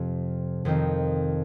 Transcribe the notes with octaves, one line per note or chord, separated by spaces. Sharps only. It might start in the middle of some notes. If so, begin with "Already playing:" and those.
Already playing: F2 C3 F3 C4
F2 D#3 C4 D#4